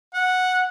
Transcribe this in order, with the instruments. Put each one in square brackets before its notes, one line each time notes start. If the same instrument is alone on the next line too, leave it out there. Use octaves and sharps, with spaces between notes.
[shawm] F#5